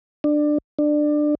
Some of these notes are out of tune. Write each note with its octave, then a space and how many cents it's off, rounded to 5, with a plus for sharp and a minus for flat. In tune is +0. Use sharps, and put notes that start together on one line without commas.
D4 +20
D4 +20